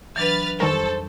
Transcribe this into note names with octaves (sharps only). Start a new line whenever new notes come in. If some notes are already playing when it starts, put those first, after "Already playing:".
E3 F#3 D4 B4 F6 A6
F2 D#3 G3 A4 A#4 C5 C#6